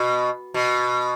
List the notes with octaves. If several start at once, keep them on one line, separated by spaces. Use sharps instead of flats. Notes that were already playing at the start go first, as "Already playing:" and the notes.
Already playing: B2
B2